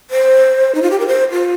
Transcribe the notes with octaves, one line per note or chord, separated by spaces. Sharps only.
C5
D#4
F4
G4
A#4
C5
F4